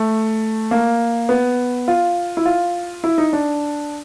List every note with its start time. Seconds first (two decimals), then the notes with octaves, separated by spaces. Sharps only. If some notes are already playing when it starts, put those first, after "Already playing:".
Already playing: A3
0.71 A#3
1.29 B3
1.88 F4
2.37 E4
2.45 F4
3.04 E4
3.18 D#4
3.33 D4